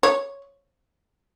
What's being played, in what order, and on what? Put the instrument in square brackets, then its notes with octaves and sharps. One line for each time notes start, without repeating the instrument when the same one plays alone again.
[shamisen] C#5